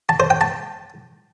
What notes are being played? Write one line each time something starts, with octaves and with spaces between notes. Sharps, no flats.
A5
C5
G5
A5